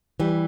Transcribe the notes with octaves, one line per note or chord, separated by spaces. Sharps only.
E3 G3